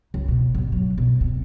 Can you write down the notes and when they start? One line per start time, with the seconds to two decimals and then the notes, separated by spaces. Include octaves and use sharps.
0.14 C#2
0.28 B2
0.54 A1 D#2
0.72 F#3
0.98 B1
1.21 C3